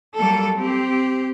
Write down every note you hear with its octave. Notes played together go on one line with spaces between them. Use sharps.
F#3 G3 A#3 A4
C4 G4